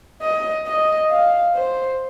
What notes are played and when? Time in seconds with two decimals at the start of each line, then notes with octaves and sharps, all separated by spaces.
0.22 D#5
0.66 D#5
1.10 F5
1.55 C5